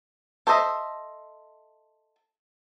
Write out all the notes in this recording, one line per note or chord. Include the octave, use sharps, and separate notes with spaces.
A4 C5 C#5 D#5 E5